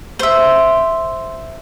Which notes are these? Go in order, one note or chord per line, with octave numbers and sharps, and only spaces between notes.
C5 E5